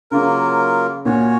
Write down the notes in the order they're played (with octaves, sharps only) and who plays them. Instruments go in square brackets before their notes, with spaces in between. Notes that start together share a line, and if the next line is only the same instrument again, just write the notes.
[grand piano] C#3 [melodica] F#3 A#3 F4 A#4
[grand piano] A#2 [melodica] C#4 F#4 C#5